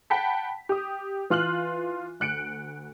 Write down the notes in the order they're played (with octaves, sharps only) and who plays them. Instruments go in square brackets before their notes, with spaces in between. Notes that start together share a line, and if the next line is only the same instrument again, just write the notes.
[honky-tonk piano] F#5 G5 A5 B5 B6
G4 D#6
E3 F4 F6 F#6 F#7
D2 F#6 C#7 D7